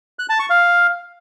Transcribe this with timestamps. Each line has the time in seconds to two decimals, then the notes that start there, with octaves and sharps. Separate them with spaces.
0.19 F#6
0.29 A5
0.39 C#6
0.50 F5